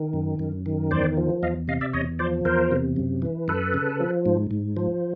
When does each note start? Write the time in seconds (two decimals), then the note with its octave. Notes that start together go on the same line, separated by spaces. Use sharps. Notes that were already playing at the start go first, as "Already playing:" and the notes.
Already playing: D#3
0.13 F#2
0.39 F#2
0.66 D#3
0.91 E2 C5 D5
1.17 F3
1.43 E2 D#5 F5
1.68 C3 D#5 F5
1.81 D5 E5
1.93 E2 C#5 D#5
2.19 F3 C5 D5
2.45 E2 A#4 C5
2.71 C3
2.96 F#2
3.22 E3
3.48 F#2 A4 B4
3.74 C#3
4.00 F3
4.26 G#2
4.51 G#2
4.77 F3